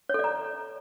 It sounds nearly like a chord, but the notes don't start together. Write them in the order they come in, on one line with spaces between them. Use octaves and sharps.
C#5 A4 D5 A#5